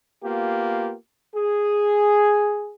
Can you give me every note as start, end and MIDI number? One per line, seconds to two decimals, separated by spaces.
0.24 0.95 58
0.24 0.95 59
0.24 0.95 65
0.24 0.95 67
1.35 2.75 68